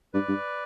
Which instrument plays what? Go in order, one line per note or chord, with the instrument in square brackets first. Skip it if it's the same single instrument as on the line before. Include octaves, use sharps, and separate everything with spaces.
[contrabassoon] G2 [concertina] B4 D5
[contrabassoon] G2